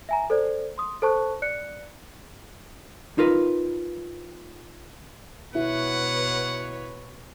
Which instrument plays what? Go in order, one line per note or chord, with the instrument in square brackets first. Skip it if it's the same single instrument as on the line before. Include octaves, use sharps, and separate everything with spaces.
[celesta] E5 G#5 A#5
A4 C5 D5
C6 D#6
A4 C5 A5 C#6 F#6
D5 F#6 C#7
[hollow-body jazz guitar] D#4 F4 A#4 B4
[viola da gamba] B2 B4 C#5 [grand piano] E4 [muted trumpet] F#5